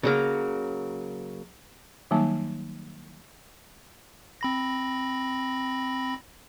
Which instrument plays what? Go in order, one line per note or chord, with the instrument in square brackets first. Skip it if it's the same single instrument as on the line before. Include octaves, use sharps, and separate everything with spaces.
[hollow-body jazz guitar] C#3 F#3 A#3
[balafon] D#3 F#3 G3 A#3 D#4 A5
[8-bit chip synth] C4 B5 A#6